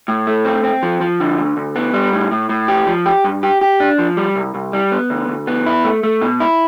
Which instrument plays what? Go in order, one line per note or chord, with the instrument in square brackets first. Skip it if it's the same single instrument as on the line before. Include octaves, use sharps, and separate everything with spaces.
[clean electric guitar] A2
A3
C4
C4
F3
F3
D3
D2
D2
B3
G3
A2
A2
A2
G4
F3
G4
G2
G4
G4
D4
F3
G3
C2
C2
G3
B3
D2
D2
B3
E4
A3
A3
B2
E4